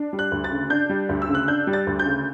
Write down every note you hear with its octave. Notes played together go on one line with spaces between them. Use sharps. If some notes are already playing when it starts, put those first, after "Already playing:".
Already playing: D4
G3
F#6
D2
A6
C#3
D4 G6
G3
D2
E6
C#3
F#6
D4 G6
G3
A6
D2
G6
C#3